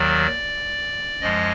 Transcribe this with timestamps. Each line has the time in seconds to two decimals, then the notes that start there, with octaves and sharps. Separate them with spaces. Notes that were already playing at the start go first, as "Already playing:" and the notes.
Already playing: D#2 D#3 F#3 D5
1.21 F#2 F3 G#3 D#5